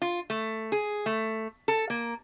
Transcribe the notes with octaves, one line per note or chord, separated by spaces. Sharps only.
F4
A3
G#4
A3
A4
A#3